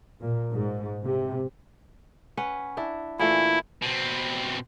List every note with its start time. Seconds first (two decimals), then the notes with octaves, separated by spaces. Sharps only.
0.21 A#2
0.53 G#2
1.05 C3
2.37 C#4 B4 F#5
2.77 D4 E4
3.19 A#2 E3 A3 E4
3.82 B2 C4